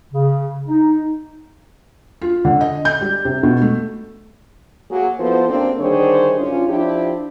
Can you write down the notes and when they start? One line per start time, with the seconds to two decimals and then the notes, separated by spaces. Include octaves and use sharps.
0.13 C#3
0.67 D#4
2.22 F4
2.45 D3
2.61 D#5
2.85 G6
3.01 G3
3.25 C3
3.43 B2
3.62 A3
4.91 F#3 A#3 G#4
5.20 F3 B3 E4 A4 C5
5.49 F#2 A#3 C4 D4 G4
5.80 D3 D#3 G3 G#4 C5 C#5
6.39 F#2 C#4 D4 F4
6.69 F3 D4 E4 G4